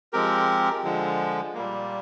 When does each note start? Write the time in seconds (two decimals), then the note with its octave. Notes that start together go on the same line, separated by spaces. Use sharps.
0.13 F3 G#3 C4 G4 A#4
0.84 D3 F3 G#3
1.55 A#2 G3 A#3